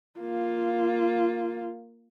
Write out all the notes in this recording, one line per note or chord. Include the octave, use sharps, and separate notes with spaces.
A#3 F4